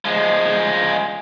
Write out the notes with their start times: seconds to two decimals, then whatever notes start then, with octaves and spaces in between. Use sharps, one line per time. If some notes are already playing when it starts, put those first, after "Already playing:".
0.05 F3 G#3